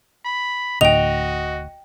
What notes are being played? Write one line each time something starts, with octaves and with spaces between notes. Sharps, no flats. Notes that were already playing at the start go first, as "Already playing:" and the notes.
B5
D1 A2 D3 F#4 D#5 G5 F7